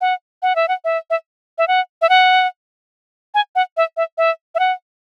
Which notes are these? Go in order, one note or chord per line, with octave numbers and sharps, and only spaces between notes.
F#5
F#5
E5
F#5
E5
E5
E5
F#5
E5
F#5
G#5
F#5
E5
E5
E5
E5
F#5